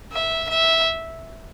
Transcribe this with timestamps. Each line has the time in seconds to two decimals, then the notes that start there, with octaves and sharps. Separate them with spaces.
0.12 E5
0.49 E5